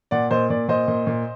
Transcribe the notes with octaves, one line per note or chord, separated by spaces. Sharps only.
A#2 D5 F#5
A#2 C5 D#5
A#2 D5
A#2 C5 D#5
A#2
A#2